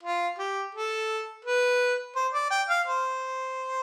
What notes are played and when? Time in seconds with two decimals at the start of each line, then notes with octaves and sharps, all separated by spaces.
0.03 F4
0.39 G4
0.75 A4
1.45 B4
2.16 C5
2.34 D5
2.51 G5
2.69 F5
2.86 C5